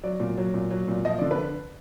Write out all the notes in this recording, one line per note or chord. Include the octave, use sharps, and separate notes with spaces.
F#3 D5
A#2
F#3
A#2
F#3
A#2
F3 D#5
D3 D5
B4